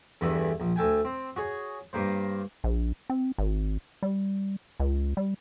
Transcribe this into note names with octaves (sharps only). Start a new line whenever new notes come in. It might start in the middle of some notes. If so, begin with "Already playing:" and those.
E2 G2 D3 E3
A#1
D2 A4 G5 G#5
C4
F#4 G#4 C#5
G2 A#3 C5
A#1
C4
G#1
G3
C#2
G3